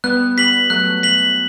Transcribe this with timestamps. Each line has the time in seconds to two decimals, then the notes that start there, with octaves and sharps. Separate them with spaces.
0.04 G3 B3 F#6
0.37 G3 B6 F#7
0.70 F#3 A3 F#6
1.03 B6 F#7